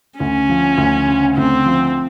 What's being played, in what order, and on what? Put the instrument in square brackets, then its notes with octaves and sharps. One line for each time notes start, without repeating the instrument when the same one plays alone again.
[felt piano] D2 [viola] C#4
[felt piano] F3
D2
C#3
[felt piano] D2 [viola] C4
[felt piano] F3